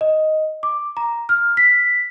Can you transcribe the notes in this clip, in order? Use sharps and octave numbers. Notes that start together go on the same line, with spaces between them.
D#5
D6
A#5
F6
B6